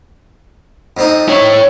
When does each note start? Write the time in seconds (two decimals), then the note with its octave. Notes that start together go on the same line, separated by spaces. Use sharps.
0.97 F2 C4 D#4
1.28 E4 C#5